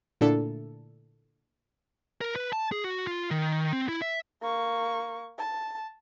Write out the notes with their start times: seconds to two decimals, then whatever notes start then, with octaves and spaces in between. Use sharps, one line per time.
0.21 A#2 D3 A3 D4 E4 A4
2.21 A#4
2.36 B4
2.53 A5
2.72 G#4
2.84 F#4
3.07 F4
3.31 D#3
3.73 C4
3.89 E4
4.02 E5
4.42 A#3 C#6
5.38 A5